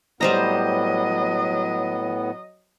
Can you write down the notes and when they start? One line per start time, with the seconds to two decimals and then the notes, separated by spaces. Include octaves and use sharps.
0.21 A2 F#3 G3 B3 C5 D#5 A#5